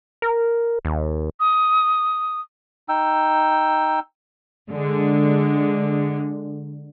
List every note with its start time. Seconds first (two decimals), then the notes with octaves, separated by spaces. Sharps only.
0.22 A#4
0.85 D#2
1.40 D#6
2.89 D#4 G5 E6
4.70 D3 G#3